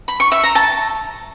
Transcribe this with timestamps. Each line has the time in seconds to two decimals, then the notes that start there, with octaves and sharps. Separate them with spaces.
0.08 B5
0.20 C#6
0.32 E5
0.43 A#5
0.55 A5